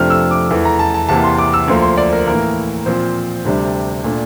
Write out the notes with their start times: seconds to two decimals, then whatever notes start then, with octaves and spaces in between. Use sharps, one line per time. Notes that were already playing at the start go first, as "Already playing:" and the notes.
Already playing: F2 C3 F3 A3 D4 F6
0.10 E6
0.31 D6
0.50 E2 E3 A3
0.65 A#5
0.79 A5
0.94 A5
1.09 E2 C3 E3 A#3 A5
1.24 C6
1.38 D6
1.54 E6
1.68 D2 D3 F3 A#3 C6
1.83 C6
1.98 D5
2.13 A#4
2.27 A2 E3 A#3 A#4
2.86 A#2 F3 C4 C5
3.45 D2 C3 G3 D4
4.04 A#2 A3 D4